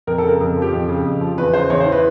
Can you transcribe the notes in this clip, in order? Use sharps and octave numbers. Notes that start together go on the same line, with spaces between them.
F2 A#4
A4
C#3 A#4
F2 A#4
F3
G4
F2
C#3
F2
F3
E2 B4
C#3 C5
E2 C#5
C5
E3
B4